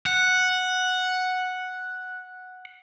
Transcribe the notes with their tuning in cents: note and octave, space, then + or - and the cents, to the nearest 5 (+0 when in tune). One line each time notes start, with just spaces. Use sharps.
F#5 -5